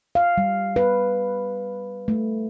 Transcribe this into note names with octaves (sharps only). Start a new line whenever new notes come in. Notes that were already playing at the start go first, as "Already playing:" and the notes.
F5
G3
B4
A3